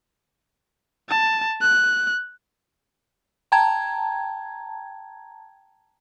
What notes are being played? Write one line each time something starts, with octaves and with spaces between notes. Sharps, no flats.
A5
F#6
G5 A5 A#5 G#6